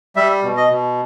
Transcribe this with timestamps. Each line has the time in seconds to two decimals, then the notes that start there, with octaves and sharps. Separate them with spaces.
0.16 G3 E5
0.44 B2
0.57 D#5
0.70 B2